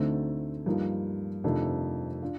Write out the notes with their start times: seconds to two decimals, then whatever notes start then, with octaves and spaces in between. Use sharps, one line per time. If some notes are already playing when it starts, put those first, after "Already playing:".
Already playing: D2 D3 A3 C4 D#4
0.66 G2 F3 A#3 D#4
1.44 F2 C3 D#3 A3 D4
2.22 D4 F4